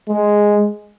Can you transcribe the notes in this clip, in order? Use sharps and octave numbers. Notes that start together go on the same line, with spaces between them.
G#3